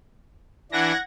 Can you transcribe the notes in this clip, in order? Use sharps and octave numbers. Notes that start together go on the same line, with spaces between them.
E3 D4 F#5 G#6 A#6